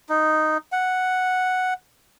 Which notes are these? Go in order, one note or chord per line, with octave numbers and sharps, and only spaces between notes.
D#4
F#5